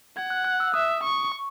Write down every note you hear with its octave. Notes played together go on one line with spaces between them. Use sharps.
F#5 G#6
F#6
F#6
E6
E5 D#6
C#6
C#6